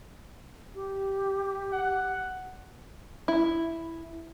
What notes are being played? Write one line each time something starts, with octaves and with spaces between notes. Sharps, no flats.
G4
F#5
E4